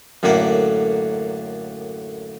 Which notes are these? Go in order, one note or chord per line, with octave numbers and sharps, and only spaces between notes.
F#2 A2 D3 A#3 D5